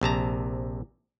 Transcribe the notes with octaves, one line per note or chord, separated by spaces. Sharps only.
A#1 C3 A5 A#5